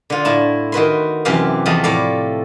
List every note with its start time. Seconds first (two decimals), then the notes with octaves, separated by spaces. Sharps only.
0.10 D3 F4
0.25 A2 E4 A5
0.72 D#3 F#4 B4 C6
1.25 F#2 C3 E3 G4 F5
1.66 E2 F3 A3 D#5
1.84 A2 A4 D5 F5